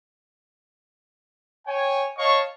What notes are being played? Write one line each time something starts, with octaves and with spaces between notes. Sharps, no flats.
C#5 G5 G#5
C#5 D#5 F5 A5 C#6